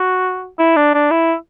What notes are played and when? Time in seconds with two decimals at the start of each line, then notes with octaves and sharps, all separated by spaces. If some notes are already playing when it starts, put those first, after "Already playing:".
Already playing: F#4
0.59 E4
0.76 D4
0.94 D4
1.11 E4